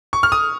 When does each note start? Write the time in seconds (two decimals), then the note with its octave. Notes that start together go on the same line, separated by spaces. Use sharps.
0.13 C#6
0.23 F6
0.32 D#6